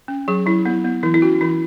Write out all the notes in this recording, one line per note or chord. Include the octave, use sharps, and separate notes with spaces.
C#4
F#3 G#4
F#3 E4
B3 E4
B3
E3 E4
E4
C#4 F#4
E3 E4